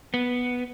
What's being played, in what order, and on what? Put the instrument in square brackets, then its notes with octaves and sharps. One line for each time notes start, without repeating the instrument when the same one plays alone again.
[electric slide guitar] B3